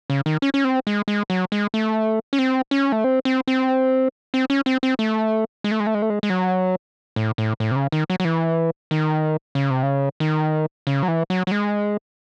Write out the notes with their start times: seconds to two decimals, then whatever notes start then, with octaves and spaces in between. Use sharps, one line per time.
0.10 C#3
0.26 D#3
0.42 C#4
0.54 C#4
0.64 C4
0.87 G#3
1.08 G#3
1.30 F#3
1.52 G#3
1.74 A3
2.33 C#4
2.39 C4
2.71 C#4
2.92 A3
3.04 C4
3.25 C4
3.47 C4
4.34 C4
4.50 C#4
4.66 C4
4.83 C4
4.99 A3
5.64 G#3
5.71 A3
5.80 G#3
5.87 A3
5.95 G#3
6.02 A3
6.10 G#3
6.23 G#3
6.30 F#3
7.16 A2
7.38 A2
7.60 A2
7.71 C3
7.76 C#3
7.92 D#3
8.10 F#3
8.20 F#3
8.25 E3
8.91 D#3
9.55 C#3
9.70 C3
9.83 C#3
10.20 D#3
10.87 C#3
11.03 F#3
11.08 E3
11.30 F#3
11.47 F#3
11.51 G#3